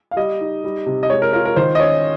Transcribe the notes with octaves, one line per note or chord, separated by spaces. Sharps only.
F5
G3 D#5
D#4
G3
C3
D#5
G#3 C#5
A#4
F4 A#4
A#4
D#3 C5
D#5
C#4 C#5